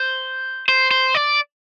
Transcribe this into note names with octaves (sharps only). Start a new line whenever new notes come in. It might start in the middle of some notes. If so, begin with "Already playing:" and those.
Already playing: C5
C5
C5
D5